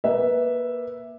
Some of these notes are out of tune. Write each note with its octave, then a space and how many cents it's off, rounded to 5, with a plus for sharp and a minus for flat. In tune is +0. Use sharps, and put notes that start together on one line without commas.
A#3 +25 B4 +0 E5 +0